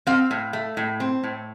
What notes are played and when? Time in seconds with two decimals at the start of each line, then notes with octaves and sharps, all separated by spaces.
0.07 C4 F5
0.31 A2
0.53 A3
0.77 A2
1.00 C4
1.24 A2